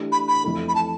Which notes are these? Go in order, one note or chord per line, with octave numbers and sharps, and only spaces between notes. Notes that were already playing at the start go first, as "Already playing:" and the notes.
Already playing: E3 A3 D4 G4
B5
B5
F2 E3 A3
B5
A5